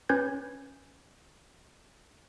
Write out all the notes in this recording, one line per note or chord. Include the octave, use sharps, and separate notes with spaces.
C#4 B4 G6 G#6